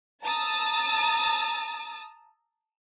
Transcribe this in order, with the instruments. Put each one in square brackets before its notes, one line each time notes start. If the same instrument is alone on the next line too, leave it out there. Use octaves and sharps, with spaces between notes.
[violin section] A5 A#5 D#6 E6 A6